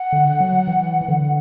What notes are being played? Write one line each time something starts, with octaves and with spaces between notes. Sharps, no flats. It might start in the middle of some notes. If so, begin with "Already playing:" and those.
Already playing: F#5
D3
F#3
E3
E3
D3